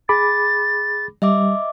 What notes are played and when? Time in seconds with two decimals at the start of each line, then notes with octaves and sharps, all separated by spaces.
0.09 G#4 B5 D6 A6
1.22 G3 D#5 E5 D6